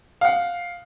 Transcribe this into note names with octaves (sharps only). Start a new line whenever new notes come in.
F5 F#5